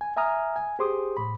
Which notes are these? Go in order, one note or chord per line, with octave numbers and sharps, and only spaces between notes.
G#5
E5 G#5 A#5 D#6 F6
G#5
G4 G#4 C5 C6 D6 D#6
A2 B5